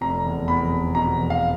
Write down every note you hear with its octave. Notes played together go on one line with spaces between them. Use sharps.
F1 A#5
E2
E2 B5
F1
B2 A#5
E2
F5